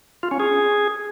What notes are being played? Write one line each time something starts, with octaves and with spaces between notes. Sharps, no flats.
F4
C#4
G#4